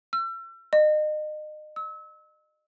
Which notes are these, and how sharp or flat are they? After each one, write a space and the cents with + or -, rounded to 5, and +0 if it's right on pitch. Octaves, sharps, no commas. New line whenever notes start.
E6 +40
D#5 -35
E6 -30